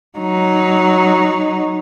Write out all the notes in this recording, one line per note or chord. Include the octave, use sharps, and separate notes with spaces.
F#3 D#4